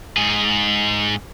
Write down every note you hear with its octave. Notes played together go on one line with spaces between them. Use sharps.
G#2 G#4